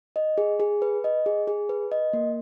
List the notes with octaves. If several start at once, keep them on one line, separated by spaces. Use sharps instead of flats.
D#5
G#4
G#4
B4
D#5
G#4
G#4
B4
D#5
A#3